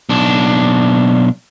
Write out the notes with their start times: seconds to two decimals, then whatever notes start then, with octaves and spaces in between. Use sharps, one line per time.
0.09 B1 D4